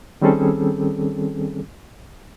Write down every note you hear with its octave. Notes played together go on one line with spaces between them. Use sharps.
D#3 G3 C4 C#4 G#4 A4